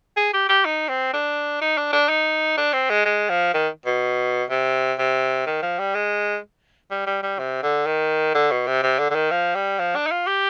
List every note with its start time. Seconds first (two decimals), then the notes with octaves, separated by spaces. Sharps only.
0.17 G#4
0.33 G4
0.49 G4
0.65 D#4
0.89 C4
1.13 D4
1.61 D#4
1.77 D4
1.93 D4
2.09 D#4
2.57 D4
2.73 C4
2.90 G#3
3.06 G#3
3.29 F3
3.54 D#3
3.86 B2
4.50 C3
4.98 C3
5.46 D#3
5.62 F3
5.79 G3
5.94 G#3
6.91 G3
7.07 G3
7.23 G3
7.39 C3
7.63 D3
7.86 D#3
8.35 D3
8.51 B2
8.67 C3
8.83 C3
8.99 D3
9.10 D3
9.15 D#3
9.31 F3
9.55 G3
9.79 F3
9.95 D4
10.06 D#4
10.11 F4
10.27 G4